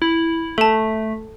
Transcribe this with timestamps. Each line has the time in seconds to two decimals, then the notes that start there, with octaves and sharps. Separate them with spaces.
0.02 E4
0.58 A3 A4 A5